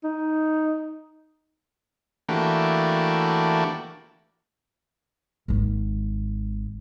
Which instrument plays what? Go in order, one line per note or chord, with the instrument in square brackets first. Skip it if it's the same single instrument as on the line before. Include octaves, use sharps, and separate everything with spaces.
[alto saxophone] D#4
[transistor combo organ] E3 A3 A#3 D4 F#4 G4
[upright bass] G#1 G#2